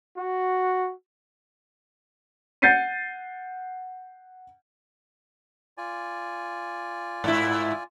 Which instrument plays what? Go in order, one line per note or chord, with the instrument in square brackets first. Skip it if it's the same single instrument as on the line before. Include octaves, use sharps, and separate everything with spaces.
[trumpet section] F#4
[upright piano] F#5 G6 A6 C7 C#7 D#7
[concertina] F4 D5 G#5
[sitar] G#2 E4